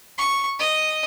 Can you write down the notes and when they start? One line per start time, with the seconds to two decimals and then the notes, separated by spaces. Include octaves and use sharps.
0.18 C#6
0.59 D#5